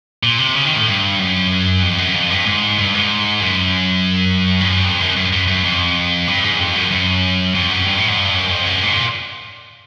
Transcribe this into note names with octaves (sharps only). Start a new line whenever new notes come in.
A#2
C3
C#3
D#3
A2
G2
F#2
F2
F#2
F2
G2
G#2
G2
G#2
F#2
G2
F#2
F2
F#2
F#2
F#2
F#2
F2
G2
G#2
F2
F#2
F#2
F2
F#2
G2
A2
G#2
G2
F#2
F2
F#2
G#2
A#2